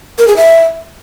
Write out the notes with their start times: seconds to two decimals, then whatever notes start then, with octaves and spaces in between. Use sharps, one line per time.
0.19 A#4
0.28 G#4
0.36 E5